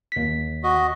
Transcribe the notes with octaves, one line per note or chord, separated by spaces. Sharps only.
D#2 B6
F#4 D#5